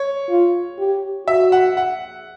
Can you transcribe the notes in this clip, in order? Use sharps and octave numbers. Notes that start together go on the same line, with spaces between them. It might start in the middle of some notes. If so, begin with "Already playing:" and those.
Already playing: C#5
F4
G4
F#4 E5
F#5
F#5